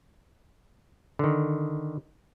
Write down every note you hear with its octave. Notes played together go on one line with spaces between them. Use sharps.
D3 D#3